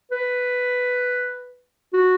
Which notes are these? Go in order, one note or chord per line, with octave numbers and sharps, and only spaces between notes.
B4
F#4